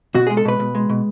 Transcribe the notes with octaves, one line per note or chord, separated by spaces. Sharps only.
B2 F#4
G#3 G#4
A4
B2 B4
B2
G#3
B2